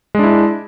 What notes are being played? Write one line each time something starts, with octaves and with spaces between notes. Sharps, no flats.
G#3 D4 E4